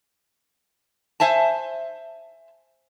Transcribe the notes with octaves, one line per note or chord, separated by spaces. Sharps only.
C5 E5 G#5 A5